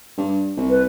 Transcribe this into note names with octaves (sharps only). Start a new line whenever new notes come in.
G2
C2
B4